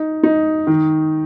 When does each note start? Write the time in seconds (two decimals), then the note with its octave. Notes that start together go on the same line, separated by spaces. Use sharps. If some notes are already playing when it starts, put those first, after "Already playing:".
Already playing: D#4
0.23 D#4
0.67 D#3